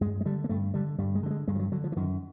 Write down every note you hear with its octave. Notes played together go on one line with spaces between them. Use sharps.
G2 G#3
G#3
D3 G3
A#3
G2 A3
D3 G3
G2 G3
G#3
D3 G3
G#3
G2 G#3
F3
F#3
D3 F#3
F3
E3
F#2 D#3